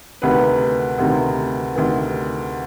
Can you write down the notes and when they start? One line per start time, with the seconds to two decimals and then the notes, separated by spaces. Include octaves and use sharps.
0.22 D2 C3 D#3 B4
0.98 D2 C3 D#3
1.75 D2 C3 D#3